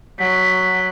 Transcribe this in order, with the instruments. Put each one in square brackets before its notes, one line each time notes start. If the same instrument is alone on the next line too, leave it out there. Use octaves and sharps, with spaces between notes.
[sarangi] F#3 [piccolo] B6